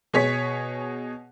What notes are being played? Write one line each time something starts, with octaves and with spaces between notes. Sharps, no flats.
B2 G#4 C#5 B6